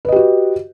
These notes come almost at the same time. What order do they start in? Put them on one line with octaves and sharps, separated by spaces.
B4 D#5 G4 F#4